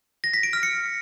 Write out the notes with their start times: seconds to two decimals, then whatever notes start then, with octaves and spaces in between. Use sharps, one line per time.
0.24 A#6
0.34 B6
0.43 D7
0.53 F6
0.63 C#7